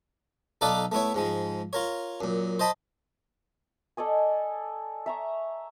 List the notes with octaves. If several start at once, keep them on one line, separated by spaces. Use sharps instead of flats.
B1 D#4 A4 B4 D5 F5
A3 B3 E4 C#5
G#2 F3 G#3
F4 A#4 C#5
F#2 A#2
C5 D#5 A5 B5
A4 D5 D#5 G#5
E5 A#5 C#6